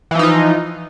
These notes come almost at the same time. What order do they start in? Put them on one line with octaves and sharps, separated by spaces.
E3 F3 D#4 F4